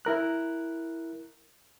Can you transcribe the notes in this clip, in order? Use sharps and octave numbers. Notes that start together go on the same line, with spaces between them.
E4 A#4 F#6